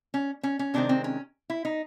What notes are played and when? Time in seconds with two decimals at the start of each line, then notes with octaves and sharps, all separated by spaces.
0.14 C#4
0.43 C#4
0.59 C#4
0.74 C3 D#3 G#3 C4 D4
0.89 C4
1.04 C#4
1.50 E4
1.65 D#4